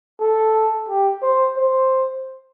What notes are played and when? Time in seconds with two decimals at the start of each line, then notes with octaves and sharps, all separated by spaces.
0.21 A4
0.89 G4
1.23 C5
1.57 C5